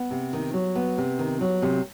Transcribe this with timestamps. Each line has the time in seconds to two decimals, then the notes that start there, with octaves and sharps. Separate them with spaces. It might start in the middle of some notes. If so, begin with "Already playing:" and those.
Already playing: B3
0.11 C3
0.33 D#3
0.53 F#3
0.76 B3
0.98 C3
1.19 D#3
1.41 F#3
1.62 C3